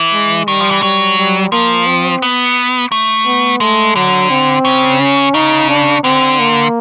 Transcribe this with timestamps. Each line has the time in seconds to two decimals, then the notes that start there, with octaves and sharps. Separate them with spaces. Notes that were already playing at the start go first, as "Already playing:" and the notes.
Already playing: E3
0.13 G#3
0.48 D#3 G3
0.60 F3
0.71 E3
0.83 F#3 G3
1.18 G3
1.52 F3 A#3
1.86 C4
2.22 B3
2.92 A3
3.26 B3
3.61 G#3 A3
3.96 D3 F#3
4.30 C4
4.65 C#3
5.00 C#4
5.34 C#3 D#4
5.69 D4
6.03 D3 C4
6.39 A#3